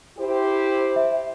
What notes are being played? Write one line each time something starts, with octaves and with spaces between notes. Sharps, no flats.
E4 G4 C5
E5